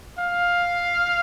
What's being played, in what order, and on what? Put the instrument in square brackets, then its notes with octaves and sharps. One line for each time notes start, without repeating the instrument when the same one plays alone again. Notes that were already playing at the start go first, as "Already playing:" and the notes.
[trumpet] F5